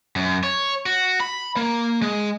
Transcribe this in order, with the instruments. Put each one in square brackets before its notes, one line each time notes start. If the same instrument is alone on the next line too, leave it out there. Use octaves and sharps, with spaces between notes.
[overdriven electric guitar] F#2
C#5
F#4
B5
A#3
G#3